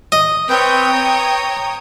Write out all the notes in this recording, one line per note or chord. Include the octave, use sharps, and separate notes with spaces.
D#5
C4 B4 C#5 G5 D#6 G6
A#5